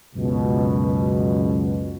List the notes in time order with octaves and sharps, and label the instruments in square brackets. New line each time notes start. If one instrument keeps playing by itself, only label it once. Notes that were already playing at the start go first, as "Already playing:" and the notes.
[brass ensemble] C#2 F#2 B2